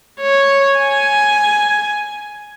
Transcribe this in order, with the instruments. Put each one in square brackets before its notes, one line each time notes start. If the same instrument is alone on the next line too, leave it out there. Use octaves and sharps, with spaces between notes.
[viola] C#5
G#5